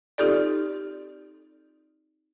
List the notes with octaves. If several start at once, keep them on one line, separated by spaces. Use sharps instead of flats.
C4 D#4 F4 G4 A4 D5